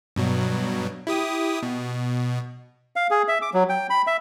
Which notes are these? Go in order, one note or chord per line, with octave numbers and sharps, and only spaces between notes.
G2 B2 F#3
E4 G4 D#6
B2
F5
G#4
E5
D6
F#3
G5
B5
E5